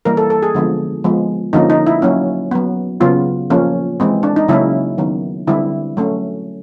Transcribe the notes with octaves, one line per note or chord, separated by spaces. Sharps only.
E3 G3 A#3 A#4
A4
A4
G#4
D3 F3 G#3 B3
F3 G#3 B3
D3 F3 A#3 C#4 D#4
D#4
E4
F#3 A#3 C#4
F#3 B3
C#3 F#3 B3 F4
F3 A#3 C#4
E3 G#3 C4
D4
D#4
C#3 F#3 A#3 C#4 E4
D#3 F#3 B3
D3 G3 C4 E4
F#3 A3 C#4